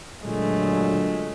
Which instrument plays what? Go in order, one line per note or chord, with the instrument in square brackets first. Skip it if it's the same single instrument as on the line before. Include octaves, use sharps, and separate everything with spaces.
[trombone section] A#2 D3 F#3 [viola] G#3 A3